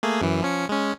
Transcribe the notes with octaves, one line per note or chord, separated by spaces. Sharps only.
A3 A#3 G#4
F#2 E3
F3 C#4 C#7
G#3 C#4